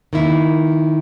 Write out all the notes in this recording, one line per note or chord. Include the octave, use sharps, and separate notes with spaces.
D#3 A#3 E4